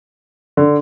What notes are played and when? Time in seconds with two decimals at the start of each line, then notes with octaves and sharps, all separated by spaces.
0.57 D3